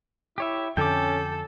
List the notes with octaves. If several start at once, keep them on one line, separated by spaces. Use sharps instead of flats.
E4 G4 C#5 E5
F2 D3 C#4 A4 G5 D6